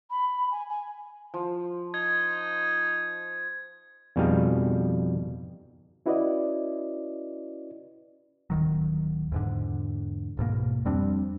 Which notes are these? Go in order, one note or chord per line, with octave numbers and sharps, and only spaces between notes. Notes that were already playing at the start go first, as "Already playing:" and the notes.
B5
G#5
G#5
F3
D#4 G#6
F2 B2 G3 D#4 G#4 F5
C#4 E4 F#4 B4 D5 D#5
D1 D#3 F#3
E2 G#2 D3
D1 G#2 B2 A#3
F2 G3 C4 D4